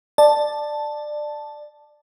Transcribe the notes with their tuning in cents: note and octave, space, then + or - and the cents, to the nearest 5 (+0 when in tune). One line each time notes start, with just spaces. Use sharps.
D5 +20 A5 +0